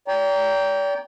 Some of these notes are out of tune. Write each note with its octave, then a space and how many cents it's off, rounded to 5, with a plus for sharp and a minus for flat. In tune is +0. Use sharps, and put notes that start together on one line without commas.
D5 -40 G5 +0 A#5 +0